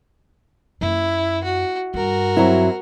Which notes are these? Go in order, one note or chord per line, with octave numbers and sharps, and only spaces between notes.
F#2 A#3 E4
F#4
G2 F#4 A#4
F#3 C4 E4